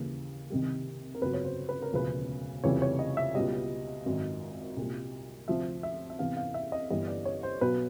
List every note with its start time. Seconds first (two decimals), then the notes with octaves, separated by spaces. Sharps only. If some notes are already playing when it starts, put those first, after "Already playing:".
Already playing: D#2 C#3 E3 G3
0.50 C2 C3 D#3 G3
1.15 A#4
1.21 G1 F2 C#3 F#3 B4
1.34 C#5
1.45 C5
1.69 B4
1.82 A#4
1.93 E1 D2 C#3 F3 B4
2.64 F1 F2 C#3 E3 G3 C#5
2.82 C#5
2.99 D#5
3.17 E5
3.35 C#2 B2 G3 D#5
4.06 G#1 F#2 D#3
4.77 C2 A#2 G3
5.48 D2 C3 F3 E5
5.83 E5
6.10 E5
6.19 E2 C3 E3 F5
6.37 F5
6.54 E5
6.72 D#5
6.90 G1 G2 E3 G3 D#5
7.07 D5
7.25 C#5
7.43 C5
7.61 B1 B2 F#3 B4